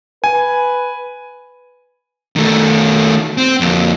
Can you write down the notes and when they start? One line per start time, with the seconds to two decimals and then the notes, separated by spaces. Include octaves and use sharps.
0.24 B4 G#5
2.36 D#3 A3
3.38 C4
3.60 F2 A#3